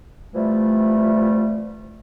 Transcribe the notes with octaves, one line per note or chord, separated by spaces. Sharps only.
C3 E3 F3 G3 A3